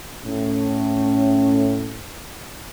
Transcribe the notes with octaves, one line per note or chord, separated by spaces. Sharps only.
A2 C#4